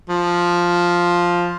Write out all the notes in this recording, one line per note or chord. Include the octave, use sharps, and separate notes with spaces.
F3